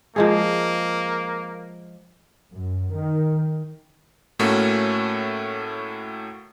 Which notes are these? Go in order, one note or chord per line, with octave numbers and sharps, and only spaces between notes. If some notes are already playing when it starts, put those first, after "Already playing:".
F3 G#3 A#3 G#4
F#2
D#3
A2 A3 A#3 C#4 F#4